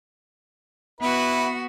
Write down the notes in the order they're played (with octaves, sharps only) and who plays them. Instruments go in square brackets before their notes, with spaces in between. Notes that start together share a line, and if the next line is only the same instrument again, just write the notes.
[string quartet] B3 F#4 [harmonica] E4 B4